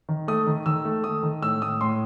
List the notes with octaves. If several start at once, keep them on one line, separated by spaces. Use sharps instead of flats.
D#3
A3 D#6
D#3
D#3 E6
A3
A3 D#6
D#3
A2 E6
A2 D#6
A2 C6